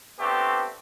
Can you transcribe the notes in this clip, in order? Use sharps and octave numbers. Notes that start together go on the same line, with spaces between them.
A3 B3 C4 D4 G4